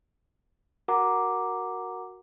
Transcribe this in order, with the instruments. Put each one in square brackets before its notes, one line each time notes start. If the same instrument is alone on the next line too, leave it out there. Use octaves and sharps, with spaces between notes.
[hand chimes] F#4 A#4 F#5 A#5 D6